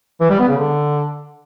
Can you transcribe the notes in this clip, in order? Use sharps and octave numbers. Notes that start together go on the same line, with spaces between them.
E3
G3
B3
C#3
D3